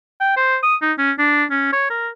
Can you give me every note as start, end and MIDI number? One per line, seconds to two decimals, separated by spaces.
0.20 0.32 79
0.37 0.57 72
0.63 0.75 87
0.82 0.93 63
0.98 1.12 61
1.19 1.44 62
1.51 1.70 61
1.72 1.88 73
1.90 2.09 70